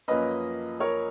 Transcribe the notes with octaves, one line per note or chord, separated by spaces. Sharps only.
F#2 F3 A#3 C#4 B4 D#5
A#4 C#5